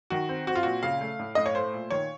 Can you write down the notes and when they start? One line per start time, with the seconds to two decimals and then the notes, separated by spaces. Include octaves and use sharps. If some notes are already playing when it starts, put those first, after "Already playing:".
0.10 D#3 F#4
0.29 C4
0.47 C4 F#4
0.55 F4
0.63 A#2 F#4
0.83 C#3 F5
1.01 A3
1.19 A2
1.35 A2 D#5
1.46 C#5
1.55 A3 C5
1.74 A#2
1.91 D#3 C#5